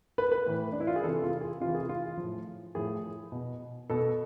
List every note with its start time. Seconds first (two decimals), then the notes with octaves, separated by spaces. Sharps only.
0.18 B4
0.32 B4
0.46 A2 E3
0.72 D4
0.80 E4
0.87 F4
0.96 G#4
1.03 E3 A4
1.07 C3
1.23 F4
1.41 G#4
1.60 C3 E3 F4
1.75 G#4
1.89 F4
2.17 F3
2.23 A2
2.75 A2 F3 G#4
3.32 B2
3.90 B2 A4